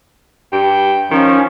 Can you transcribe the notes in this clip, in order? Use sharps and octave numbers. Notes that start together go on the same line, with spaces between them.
G2 G5
D#3 F3 C#4